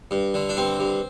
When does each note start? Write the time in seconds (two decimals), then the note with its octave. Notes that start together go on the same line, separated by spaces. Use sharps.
0.11 G2
0.34 D3
0.49 D4
0.57 G2 C4
0.80 G2